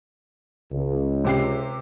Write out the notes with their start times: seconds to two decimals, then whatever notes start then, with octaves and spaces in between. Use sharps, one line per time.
0.71 C#2
1.25 C3 G4 C7